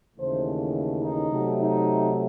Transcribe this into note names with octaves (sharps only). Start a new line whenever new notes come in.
D#2 C#3 E3 A3 C5
D#4
C3 F#3 A3
D#4